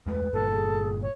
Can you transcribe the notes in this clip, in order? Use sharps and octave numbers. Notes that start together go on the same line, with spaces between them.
E2 G#3 A3 B4
G1 G2 A#2 A4
G#4
C#5